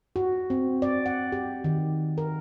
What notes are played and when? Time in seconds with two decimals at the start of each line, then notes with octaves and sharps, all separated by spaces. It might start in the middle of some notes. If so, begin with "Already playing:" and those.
0.16 F#4
0.50 C4
0.82 D5
1.06 F#5
1.32 G4
1.64 D#3
2.18 A#4